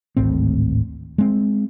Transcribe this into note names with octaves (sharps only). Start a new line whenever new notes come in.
D1 G#1 A2 C4
G#3 C4